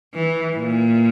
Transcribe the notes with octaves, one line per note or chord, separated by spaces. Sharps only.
E3
A#2